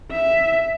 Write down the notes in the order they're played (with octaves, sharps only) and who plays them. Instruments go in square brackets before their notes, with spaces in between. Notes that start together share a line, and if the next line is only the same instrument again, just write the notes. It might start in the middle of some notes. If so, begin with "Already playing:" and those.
[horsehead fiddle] E5